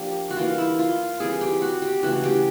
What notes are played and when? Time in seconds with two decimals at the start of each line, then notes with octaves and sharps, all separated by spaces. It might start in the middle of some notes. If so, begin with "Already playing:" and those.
Already playing: F3 A#3 D4 G4
0.30 F#4
0.37 E3 G3 A#3 F4
0.58 E4
0.79 F4
1.20 E3 G3 C4 G#4
1.41 G4
1.62 F#4
1.82 G4
2.03 C#3 E3 A3 C#4 F#4
2.23 G4